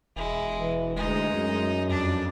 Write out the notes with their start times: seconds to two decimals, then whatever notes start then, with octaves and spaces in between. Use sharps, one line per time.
0.16 E1 G#3 E4
0.59 E3
0.96 D2 G#3 D#4
1.28 F#2
1.89 F2 D4